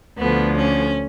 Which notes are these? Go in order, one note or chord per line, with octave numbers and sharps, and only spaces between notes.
D2 D3 F3 B3
C#4